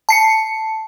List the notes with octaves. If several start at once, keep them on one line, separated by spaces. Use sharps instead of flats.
A5 C7 C#7